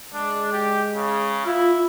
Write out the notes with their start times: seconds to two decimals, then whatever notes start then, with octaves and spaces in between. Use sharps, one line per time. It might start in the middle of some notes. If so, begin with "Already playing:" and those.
0.14 G#3 D4
0.53 G4
0.95 C#3
1.45 E4 F4